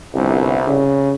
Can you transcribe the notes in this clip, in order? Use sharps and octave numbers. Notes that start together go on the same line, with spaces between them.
G1 C2
C#3